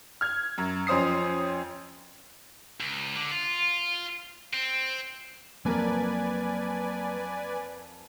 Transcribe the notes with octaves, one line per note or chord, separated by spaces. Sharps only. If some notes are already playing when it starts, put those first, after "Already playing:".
F6 G#6
F#2
F2 C#4 C5 D#6 C7
C#2
D3
F4
C4
F2 F#3 A#3 A#4 B4 D5 G#5